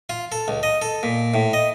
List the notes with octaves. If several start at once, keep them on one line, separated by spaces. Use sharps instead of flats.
F4
A4
C#2
D#5
A4
A#2
A2
D#5